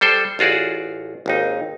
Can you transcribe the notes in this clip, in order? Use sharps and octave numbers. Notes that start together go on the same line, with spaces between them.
G3 A4 C5 G5
A1 F4 F#4 G#4 D5
G#1 D#2 D#4